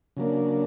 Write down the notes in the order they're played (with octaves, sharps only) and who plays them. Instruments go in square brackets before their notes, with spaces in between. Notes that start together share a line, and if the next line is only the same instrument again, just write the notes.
[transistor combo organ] C#3 F#3 A#3 D4